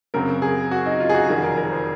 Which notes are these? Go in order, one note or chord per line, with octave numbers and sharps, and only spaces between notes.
F#2 C#3 F#3 C4 A#4
G#4
F#4
D#4
F4
G#4
F#4
F1 F2 D#3 G#4
A#4
A#4
C5